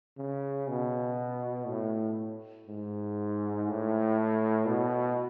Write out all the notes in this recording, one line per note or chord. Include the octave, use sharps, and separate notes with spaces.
C#3
B2
A2
G#2
A2
B2